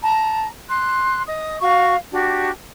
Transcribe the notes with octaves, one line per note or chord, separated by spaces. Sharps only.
A5 A#5
C6 F#6
D#5 D#6
F#4 F5 C#6
D4 F#4 G4